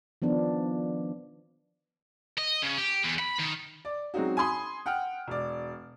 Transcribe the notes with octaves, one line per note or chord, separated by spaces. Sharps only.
D#3 F3 B3 D4
D#5
C#3
G4
E2
B5
D#3
D5
F#3 G#3 C4 C#4 D#4 F#4
G#5 B5 C6 D#6
F#5 G5 F6
E1 D5